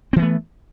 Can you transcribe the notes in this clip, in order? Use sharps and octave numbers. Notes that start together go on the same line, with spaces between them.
E3 A3 B3 C4